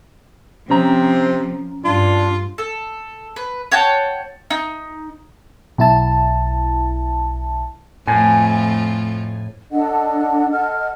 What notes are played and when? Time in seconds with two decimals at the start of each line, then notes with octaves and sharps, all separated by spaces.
0.70 C3 F3 C4 C#4 A#5
1.85 G2 D4 F4
2.58 A4
3.36 B4
3.72 C#5 F#5 G5 A5
4.50 D#4
5.78 B1 E4 A5
8.07 F2 A2 A3 F4 G#5
9.72 D4 A4 D#5 F#5
10.51 A4 D#5 F#5 F6